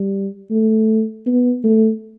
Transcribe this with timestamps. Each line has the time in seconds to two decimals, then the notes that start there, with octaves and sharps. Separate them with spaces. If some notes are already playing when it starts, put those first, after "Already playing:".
Already playing: G3
0.51 A3
1.26 B3
1.64 A3